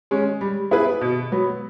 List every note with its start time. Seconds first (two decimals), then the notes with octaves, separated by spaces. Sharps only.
0.11 G#3 C#4
0.41 G3
0.71 B3 E4 G#4 B4
1.01 B2
1.32 F#3 B3